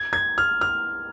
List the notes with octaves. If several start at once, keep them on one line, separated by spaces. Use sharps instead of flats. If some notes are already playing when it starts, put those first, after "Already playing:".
Already playing: G#6
G#6
F6
F6